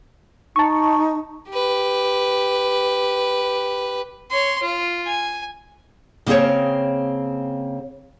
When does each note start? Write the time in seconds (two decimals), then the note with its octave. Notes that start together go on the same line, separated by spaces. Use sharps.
0.56 D#4 A5 C#6
1.50 G4 B4
4.30 C#5 C6
4.62 F4
5.06 G#5
6.26 C#3 A#3 C4 G#4 C5 C#5